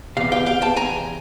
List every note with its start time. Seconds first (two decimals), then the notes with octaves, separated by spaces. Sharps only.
0.17 E2 C3 F5
0.32 F5 G5
0.46 F5 G5
0.62 G5 A5
0.76 G#5 A#5